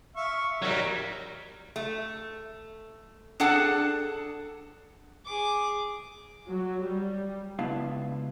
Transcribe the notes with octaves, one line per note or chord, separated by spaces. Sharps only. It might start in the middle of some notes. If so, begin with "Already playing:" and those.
E5 F5 C#6
F#3 G3 D#4 A#4 A#5
A3
D4 G#4 A4 F#5 A5
G#4 D6
F#3
G3
C#2 B3 D4 E4 F5